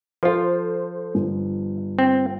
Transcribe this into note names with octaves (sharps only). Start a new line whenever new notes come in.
F3 F4 A4 C5
G1
C4